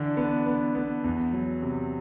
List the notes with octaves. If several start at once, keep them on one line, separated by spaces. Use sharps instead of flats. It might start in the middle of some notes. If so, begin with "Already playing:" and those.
Already playing: D3 E3 D4
B3
B3
B3
E2
F#3
C3